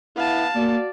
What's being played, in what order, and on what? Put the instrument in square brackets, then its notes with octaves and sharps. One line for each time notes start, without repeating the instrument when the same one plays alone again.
[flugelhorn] B3 [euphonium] E4 [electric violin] F5 A5
[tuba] A#3 [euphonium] F#4 [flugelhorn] D5